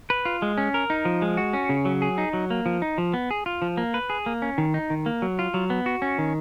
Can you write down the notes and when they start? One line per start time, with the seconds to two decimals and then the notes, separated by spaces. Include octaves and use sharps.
0.10 B4
0.25 F4
0.42 G#3
0.58 C#4
0.74 A#4
0.90 D#4
1.05 F3
1.22 G#3
1.37 F#4
1.53 C#4
1.69 C#3
1.85 F#3
2.02 G#4
2.18 D#4
2.33 F#3
2.50 A#3
2.66 F3
2.82 D#4
2.98 F3
3.14 B3
3.31 G#4
3.46 F4
3.62 F3
3.77 A#3
3.94 B4
4.10 G#4
4.26 A#3
4.42 C#4
4.58 D#3
4.74 D#4
4.90 D#3
5.06 A#3
5.22 F#3
5.39 F4
5.54 F#3
5.70 B3
5.86 F#4
6.02 C#4
6.18 D#3